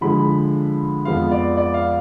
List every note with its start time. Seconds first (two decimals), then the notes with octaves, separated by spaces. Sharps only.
0.01 D3 F3 G#3 B5
1.05 F2 F3 G#3 B3 F4 F5
1.31 D5
1.57 D5
1.74 F5